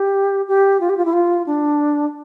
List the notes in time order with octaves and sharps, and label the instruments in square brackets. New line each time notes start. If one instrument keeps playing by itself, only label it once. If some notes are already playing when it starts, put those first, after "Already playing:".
Already playing: [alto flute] G4
G4
F4
G4
F4
E4
F4
D4